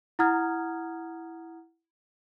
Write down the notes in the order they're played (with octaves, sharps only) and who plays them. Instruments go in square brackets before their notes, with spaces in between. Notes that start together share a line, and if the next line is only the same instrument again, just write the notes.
[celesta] E4 F#5 A#5 D#6 F6 G#6